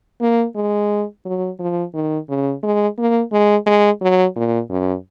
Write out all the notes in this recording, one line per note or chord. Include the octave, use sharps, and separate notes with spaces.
A#3
G#3
F#3
F3
D#3
C#3
G#3
A#3
G#3
G#3
F#3
A#2
F#2